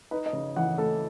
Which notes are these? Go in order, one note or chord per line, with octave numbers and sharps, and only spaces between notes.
D#4 B4
D#5
C#3
E3 F#5
A3 A4